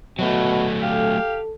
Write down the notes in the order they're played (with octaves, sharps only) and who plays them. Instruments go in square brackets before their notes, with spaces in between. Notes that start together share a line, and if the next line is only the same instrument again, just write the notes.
[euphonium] B2 [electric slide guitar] F#3 A3
[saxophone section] G4 F5 [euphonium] A4